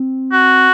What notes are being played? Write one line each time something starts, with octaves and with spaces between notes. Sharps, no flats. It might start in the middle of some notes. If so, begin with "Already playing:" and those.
Already playing: C4
F#4